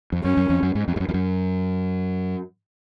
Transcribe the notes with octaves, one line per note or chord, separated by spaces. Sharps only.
F2
F#2 C#4
F#2
F2
F#2
G#2
F2
G#2
F#2
F2
F#2